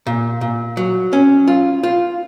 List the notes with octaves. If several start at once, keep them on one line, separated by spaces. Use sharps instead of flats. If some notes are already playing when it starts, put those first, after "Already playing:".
A#2
A#2
F#3
C#4
F4
F4